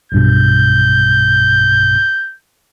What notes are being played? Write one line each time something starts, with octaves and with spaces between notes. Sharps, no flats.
B1 G2 B2 G6